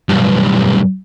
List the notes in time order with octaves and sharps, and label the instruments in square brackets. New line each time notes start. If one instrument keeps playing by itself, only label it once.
[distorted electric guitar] B1 G2